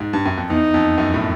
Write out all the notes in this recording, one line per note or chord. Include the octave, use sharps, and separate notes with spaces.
G#2
G2
F#2
F2
E2 D#4
F2
F#2
A2